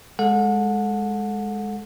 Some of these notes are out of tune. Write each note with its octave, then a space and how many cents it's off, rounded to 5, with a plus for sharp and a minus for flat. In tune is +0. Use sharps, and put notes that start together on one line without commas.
G#3 +0 A4 +0 F#5 -30